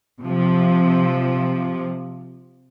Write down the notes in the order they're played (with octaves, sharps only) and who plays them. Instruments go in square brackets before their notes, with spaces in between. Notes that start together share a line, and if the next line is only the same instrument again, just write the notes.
[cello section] C3 F3